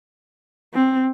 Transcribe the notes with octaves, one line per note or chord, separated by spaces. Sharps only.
C4